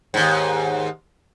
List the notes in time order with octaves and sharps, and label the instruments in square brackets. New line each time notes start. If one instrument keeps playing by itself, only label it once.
[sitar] D#2 G#2